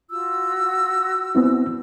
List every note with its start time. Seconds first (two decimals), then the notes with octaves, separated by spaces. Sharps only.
0.10 F4 F#4 E6
1.35 B3 C4 E4